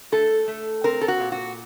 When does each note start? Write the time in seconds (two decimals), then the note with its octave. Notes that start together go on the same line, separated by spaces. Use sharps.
0.12 A3 A4
0.48 A3
0.84 C4 A#4
1.01 A4
1.08 F#4
1.20 A#2
1.32 F#4